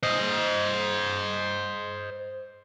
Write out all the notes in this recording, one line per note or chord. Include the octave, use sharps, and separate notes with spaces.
C5 D#5